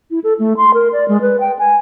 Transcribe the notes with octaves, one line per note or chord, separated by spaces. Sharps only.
E4
A4
A3
C6
A#4
D5
G#3
B4
G5
G#5